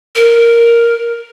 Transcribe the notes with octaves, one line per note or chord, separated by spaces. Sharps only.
A#4